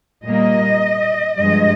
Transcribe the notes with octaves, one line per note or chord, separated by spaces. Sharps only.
A#2 G3 A#3 D#5
G2 F3 G#3 D#5